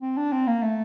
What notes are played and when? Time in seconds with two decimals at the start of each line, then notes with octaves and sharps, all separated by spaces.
0.02 C4
0.17 D4
0.32 C4
0.47 A#3
0.62 A3